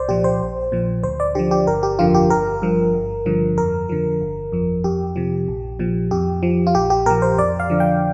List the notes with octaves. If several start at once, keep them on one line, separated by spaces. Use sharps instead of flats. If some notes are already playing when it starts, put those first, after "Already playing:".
Already playing: C2 C5 D5
A#2 F3 G4
C5
A#1
A#2 F3
D2 C5
D5
D3 F3 G4
G4
G1 A#4
G4
F2 D3 F3 F4
G4
G1 A#4
G2 F3
G1
G2 D3 F3
F2 A#4
D3 F3
G1
F2 F3
F2 G4
C3 F3
A#1
A#2 F3
F2 G4
F3
F4
A#1 G4
G4
A#2 F3 A#4
C5
F2 D5
F5
D3 F3
G5